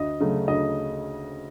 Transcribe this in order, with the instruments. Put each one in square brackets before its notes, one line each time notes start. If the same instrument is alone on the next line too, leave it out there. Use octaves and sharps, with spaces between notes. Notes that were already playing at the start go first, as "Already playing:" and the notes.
Already playing: [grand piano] D2 D#5
C#3 F#3 A3
D2 D#5